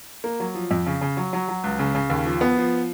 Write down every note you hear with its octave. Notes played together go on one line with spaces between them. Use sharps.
A#3
F#3
F3
F2
C#3
C#3
F#3
F#3
F#3
C#2
C#3
C#3
D#2
F3
B3
F3